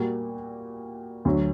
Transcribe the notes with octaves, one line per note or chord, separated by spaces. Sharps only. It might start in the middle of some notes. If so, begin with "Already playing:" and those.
Already playing: A#2 G3 A#3 F#4
D2 D3 F#3